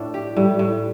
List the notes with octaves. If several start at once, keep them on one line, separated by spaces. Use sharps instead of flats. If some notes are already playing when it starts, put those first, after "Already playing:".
Already playing: A2 D4
G4
A2 G3
A2